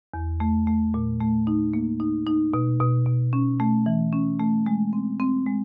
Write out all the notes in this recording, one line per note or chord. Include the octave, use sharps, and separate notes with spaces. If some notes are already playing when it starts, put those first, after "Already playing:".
E2
A3
A3
A#2
A3
D#4
A#3
D#4
D#4
B2
B2
B2
C#4
A3
E3
C#4
A3
G#3
C4
C4
G#3